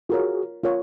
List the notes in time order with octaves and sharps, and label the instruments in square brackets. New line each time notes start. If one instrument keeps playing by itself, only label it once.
[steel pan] F4 A#4 C#5 [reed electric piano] F#4 G#4
[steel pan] F4 A#4 C#5